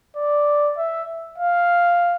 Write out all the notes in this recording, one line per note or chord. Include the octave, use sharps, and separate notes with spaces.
D5
E5
F5